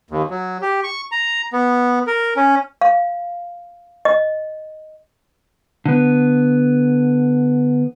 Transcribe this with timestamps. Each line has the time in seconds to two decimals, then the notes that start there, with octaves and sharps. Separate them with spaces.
0.11 D#2
0.30 F#3
0.62 G4
0.84 C#6
1.12 A#5
1.53 B3
2.07 A#4
2.36 C#4
2.81 F5
4.05 D#5
5.86 D3 B3